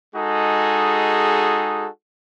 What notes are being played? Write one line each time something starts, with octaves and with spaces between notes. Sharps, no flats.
G#3 D#4 F#4 G#4 A4